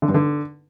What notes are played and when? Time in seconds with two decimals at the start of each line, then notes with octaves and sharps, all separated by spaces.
0.02 D3
0.08 G2
0.14 D3